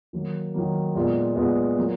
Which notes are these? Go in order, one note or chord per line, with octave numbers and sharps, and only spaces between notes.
D#3 F#3 A#3
D#3 F#3 A#3
A#2 G#3 B3 F4
A#2 G#3 B3 F4
F#3 A#3 F4